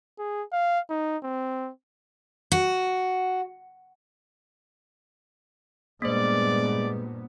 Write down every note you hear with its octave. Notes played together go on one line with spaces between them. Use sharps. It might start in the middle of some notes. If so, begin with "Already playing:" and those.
G#4
F5
D#4
C4
F#4
G2 A#2 G#3 A#3 B3 C5 D5